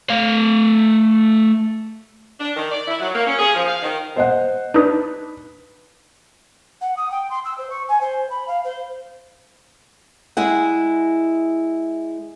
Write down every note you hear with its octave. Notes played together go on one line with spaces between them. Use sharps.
A3 F5
D4
D#3
D5
E4
F#3
A#3
C#4
G#4
F3
F5
D#3
C5 D#5 F#5
D4 D#4 B4
F#5
D#6
G5
C6
E6
C5
C#6
G#5
C5
B5
F5
C5
G#3 E4 G#4 F#5